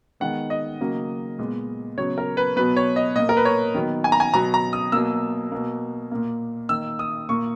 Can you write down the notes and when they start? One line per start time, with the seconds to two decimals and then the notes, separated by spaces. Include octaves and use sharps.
0.20 D#3 G#3 B3 F#5
0.50 D#5
0.80 C#3 F#3 A#3
1.38 A#2 G#3 B3
1.97 C#3 F#3 B3 C#5
2.18 A#4
2.37 B4
2.56 B2 F#3 B3 B4
2.77 C#5
2.96 D#5
3.15 A#2 A#3 D#5
3.29 A#4
3.37 B4
3.45 C#5
3.74 D#3 F#3 B3
4.04 G#5
4.12 A#5
4.20 G#5
4.33 B2 F#3 B3 A#5
4.54 A#5
4.73 D#6
4.92 B2 F#3 A#3 E6
5.52 B2 A#3
6.11 A#2 A#3
6.69 D#3 A#3 E6
6.99 D#6
7.29 A#2 A#3 C#6